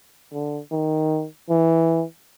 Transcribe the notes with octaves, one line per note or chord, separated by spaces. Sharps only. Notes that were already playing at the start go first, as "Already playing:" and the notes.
D3
D#3
E3